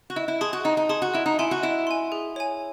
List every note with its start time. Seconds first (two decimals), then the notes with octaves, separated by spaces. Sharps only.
0.10 F#4
0.16 E4 D#5
0.28 E4
0.41 G#4 A5 C6 D#6
0.53 F#4
0.65 D#4 D#5
0.77 D#4
0.89 G#4 A5 C6 D#6
1.02 F#4
1.14 E4 D#5
1.26 D#4
1.39 E4 G#5 C6
1.51 F#4
1.63 E4 D#5
1.87 G#5 C6
2.12 G#4
2.36 C#5 G#5